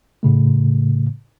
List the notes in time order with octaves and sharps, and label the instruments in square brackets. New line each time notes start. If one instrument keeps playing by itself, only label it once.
[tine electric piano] A2 C#3 A3